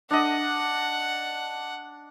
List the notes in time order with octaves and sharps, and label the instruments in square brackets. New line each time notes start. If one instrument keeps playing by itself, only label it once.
[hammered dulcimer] D4 D#5 [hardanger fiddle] F#5